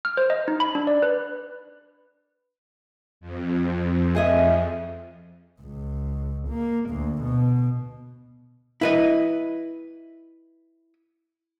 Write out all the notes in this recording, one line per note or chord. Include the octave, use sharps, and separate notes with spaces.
F6
C5
D#5
D#4
B5
D4
D5
B4
F2
G#4 D#5 E5
C#2
A#3
D2
B2
E4 B4 D#5